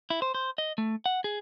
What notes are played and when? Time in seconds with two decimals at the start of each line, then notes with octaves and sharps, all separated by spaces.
0.10 E4
0.22 C5
0.35 C5
0.58 D#5
0.78 A3
1.06 F#5
1.24 G#4